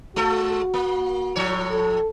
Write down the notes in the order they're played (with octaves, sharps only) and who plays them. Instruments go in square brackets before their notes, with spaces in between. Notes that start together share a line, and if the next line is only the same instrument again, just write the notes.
[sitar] G#3 A4 [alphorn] F#4
[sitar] A#3
A2 F3 C#5
[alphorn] A4